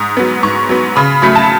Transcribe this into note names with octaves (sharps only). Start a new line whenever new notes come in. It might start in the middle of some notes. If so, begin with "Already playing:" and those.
Already playing: G#2 D#6
F#3 B3
G#2 C#6
F#3 B3
C#3 B5
F#3 A3 B5
A5